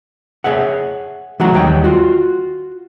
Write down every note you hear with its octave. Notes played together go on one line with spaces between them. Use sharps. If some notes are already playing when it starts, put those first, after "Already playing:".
G#4 C#5 E5 F#5
E3 F#3 A3 F#4 F#5 A#5
D#2 G3 C#5 G5
F4 F#4